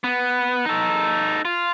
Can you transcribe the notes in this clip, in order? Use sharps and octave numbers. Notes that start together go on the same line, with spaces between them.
B3
D#4 A4
F4